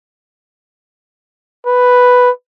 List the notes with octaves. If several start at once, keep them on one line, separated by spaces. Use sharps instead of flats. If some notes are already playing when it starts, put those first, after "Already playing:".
B4